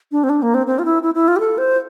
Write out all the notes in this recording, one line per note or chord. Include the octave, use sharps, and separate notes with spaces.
D4
C4
D4
A#3
C4
C4
F4
E4
E4
E4
F4
G4
A4
C5